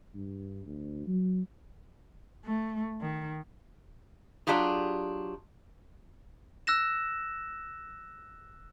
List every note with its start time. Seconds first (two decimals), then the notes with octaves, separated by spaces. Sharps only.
0.15 G2
0.65 D2
1.07 F#3
2.45 A3
3.01 D#3
4.47 F#3 D4 D#4 F4 G4 G#4
6.67 E6 F#6 A#6 E7